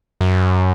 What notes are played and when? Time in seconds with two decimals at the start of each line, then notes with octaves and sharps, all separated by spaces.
0.21 F#2